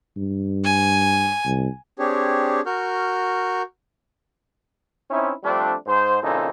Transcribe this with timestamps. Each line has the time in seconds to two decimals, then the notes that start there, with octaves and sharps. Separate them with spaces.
0.17 G2
0.64 G#5
1.45 C2
1.99 C4 D4 G4 G#4 C#5
2.66 F#4 A#4 C#6 F6 G6
5.11 C4 C#4 D#4 E4
5.44 F3 G3 A3 C4 D4
5.87 G#2 C5
6.23 A#2 C#3 E3 C4 D#4 A4